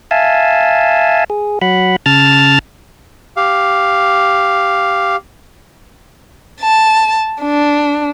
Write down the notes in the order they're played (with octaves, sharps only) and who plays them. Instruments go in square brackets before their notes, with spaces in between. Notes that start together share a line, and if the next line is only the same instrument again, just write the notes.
[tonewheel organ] E5 F5 G#5 A5
G#4
F#3 F#5 B5
C#3 A5 F6 A6
[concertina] G4 F5
[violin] A5
D4